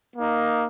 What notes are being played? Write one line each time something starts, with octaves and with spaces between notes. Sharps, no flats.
A#3 D#4